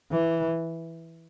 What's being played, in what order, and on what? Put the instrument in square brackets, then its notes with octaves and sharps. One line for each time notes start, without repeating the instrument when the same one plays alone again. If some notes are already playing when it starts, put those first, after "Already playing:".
[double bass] E3